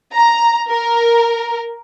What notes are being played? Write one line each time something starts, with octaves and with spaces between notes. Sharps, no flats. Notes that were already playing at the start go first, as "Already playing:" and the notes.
A#5
A#4